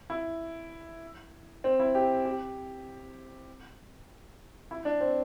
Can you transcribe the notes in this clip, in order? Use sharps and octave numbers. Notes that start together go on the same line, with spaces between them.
E4
C4
E4
G4
G4
E4
D4
C4